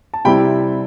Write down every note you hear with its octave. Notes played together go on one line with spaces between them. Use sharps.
A5
C3 G3 C4 E4 G5 B5